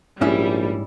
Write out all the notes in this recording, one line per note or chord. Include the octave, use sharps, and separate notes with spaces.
A#1 G#2 G3 C#4 E4